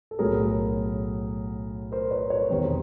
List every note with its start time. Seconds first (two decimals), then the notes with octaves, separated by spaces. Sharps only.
0.11 A4
0.19 B1 A2 F#3 G#4 A#4
1.92 A#4 C5
2.11 B4 C#5
2.30 B4 C#5
2.49 E1 E2 C3 D#3 A#4 C5